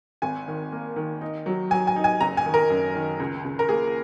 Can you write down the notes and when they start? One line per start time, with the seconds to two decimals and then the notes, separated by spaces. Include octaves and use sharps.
0.22 G#1 G#5
0.48 D#3
0.72 A#3
0.96 D#3
1.21 D#4
1.46 F#3
1.71 F#3 G#5
1.87 G#5
1.96 D#4
2.04 G#5
2.20 F#1 A#5
2.37 G#5
2.45 D#3
2.54 A#4
2.70 F#2
2.95 D#3
3.20 C#2
3.44 C#2
3.59 A#4
3.69 A#3 G#4